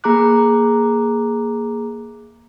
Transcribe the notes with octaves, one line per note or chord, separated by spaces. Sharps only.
A#3 G#4 A#5 D6 F#6